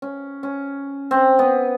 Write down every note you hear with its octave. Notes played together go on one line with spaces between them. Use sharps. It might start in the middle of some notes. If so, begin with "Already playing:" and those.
C#4
C#4
C4
B3